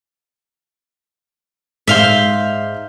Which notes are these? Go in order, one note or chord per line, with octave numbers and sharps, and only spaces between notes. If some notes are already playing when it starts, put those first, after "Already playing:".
G#2 E5 F5 C6 G6